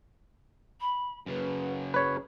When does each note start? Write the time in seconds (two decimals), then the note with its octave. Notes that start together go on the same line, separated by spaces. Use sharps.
0.80 B5
1.26 F#2 C#3 B4
1.94 G#4 B4 C#5